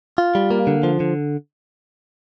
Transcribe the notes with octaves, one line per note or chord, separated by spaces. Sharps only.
F4
G3
A#3
D3
F3
D3